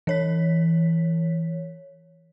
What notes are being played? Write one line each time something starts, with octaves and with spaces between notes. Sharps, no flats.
E3 C#5 B6